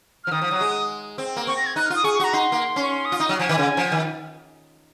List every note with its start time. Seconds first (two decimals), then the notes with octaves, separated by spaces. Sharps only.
0.24 F6
0.27 F3
0.31 D#3 D#6
0.42 F3
0.51 F#3
0.61 G#3
1.18 C4
1.36 A#3
1.47 C4 C#6
1.57 A#6
1.66 G#6
1.76 D#4 F#6
1.86 F6
1.90 F4 D#6
2.04 G#4 C#6
2.14 C#6
2.20 F#4 A#5
2.33 D#4 C6
2.52 A#3
2.76 C#4
2.83 C#6
2.91 C6
3.05 D#6
3.12 F4
3.20 D#4 D#6
3.29 F#3 F6
3.39 F3 G#5
3.49 D#3
3.58 C#3
3.77 F3
3.92 D#3